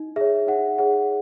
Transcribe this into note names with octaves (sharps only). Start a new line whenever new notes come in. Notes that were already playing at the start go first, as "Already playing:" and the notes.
Already playing: D#4
G#4 C#5 E5
D#4 F#5
G#4 C#5 F#5